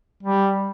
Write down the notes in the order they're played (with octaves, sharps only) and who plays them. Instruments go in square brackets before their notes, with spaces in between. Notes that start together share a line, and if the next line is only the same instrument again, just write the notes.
[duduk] G3